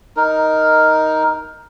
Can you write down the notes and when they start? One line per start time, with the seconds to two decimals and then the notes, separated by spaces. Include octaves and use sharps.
0.17 D#4 A#4